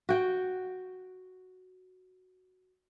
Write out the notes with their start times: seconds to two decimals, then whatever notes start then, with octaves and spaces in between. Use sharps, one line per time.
0.09 F#4 G5